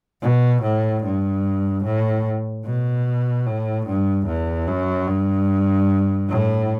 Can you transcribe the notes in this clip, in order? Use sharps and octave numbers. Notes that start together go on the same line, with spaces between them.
B2
A2
G2
A2
B2
A2
G2
E2
F#2
G2
A2